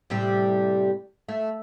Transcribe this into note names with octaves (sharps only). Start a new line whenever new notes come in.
A2 C3 G3
A3